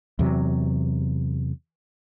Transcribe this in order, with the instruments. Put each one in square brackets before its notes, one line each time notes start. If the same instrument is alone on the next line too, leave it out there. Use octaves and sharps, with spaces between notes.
[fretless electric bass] E2 C3 F#3